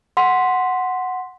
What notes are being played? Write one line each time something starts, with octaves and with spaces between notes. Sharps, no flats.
F#5 C6 B6